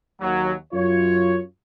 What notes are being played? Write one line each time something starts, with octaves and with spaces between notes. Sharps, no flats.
D#2 F#3
F#2 F4 C#5